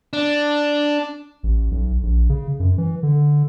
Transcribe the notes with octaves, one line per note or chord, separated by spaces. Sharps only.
D4
A1
B1
A#1
C#3
F#2
E3
D3